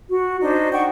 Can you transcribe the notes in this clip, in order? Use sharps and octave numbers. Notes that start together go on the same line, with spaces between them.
F#4
D4 D#4 C5
F#5 G5 C#6